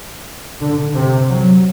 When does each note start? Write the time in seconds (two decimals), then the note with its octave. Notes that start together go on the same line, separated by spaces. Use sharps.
0.61 D3
0.95 C3
1.29 F#3